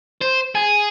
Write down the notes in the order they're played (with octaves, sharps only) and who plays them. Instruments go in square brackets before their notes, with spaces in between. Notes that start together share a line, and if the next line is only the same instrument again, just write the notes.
[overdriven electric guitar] C5
G#4